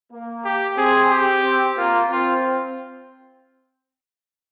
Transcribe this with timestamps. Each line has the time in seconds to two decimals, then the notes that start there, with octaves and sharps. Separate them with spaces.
0.12 A#3
0.45 G4
0.78 C4 G#4
1.11 G4
1.45 C4
1.77 A#3 F4
2.11 C4 F4